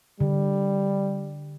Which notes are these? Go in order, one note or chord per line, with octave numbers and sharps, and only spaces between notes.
D3 G3